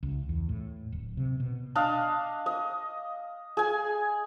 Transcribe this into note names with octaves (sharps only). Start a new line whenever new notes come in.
C#2
E2
A2
D1
C3
B2
D4 D#5 F5
D#5
G#4 G#5